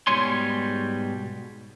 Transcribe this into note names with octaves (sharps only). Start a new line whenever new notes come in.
G#2 B2 G3 C#5 G#5 C6